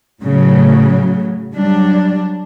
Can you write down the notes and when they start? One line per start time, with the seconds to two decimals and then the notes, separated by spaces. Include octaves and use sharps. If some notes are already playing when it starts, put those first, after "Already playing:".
0.23 A2 C#3 F#3
1.55 F#3 G3 D4